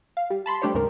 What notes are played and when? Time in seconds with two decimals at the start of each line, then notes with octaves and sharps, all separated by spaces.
0.17 F5
0.30 G3
0.46 A5 B5 C6
0.62 G3 A3 D4 G4 C5 C#5
0.74 D#2 G#2 C#3 A#4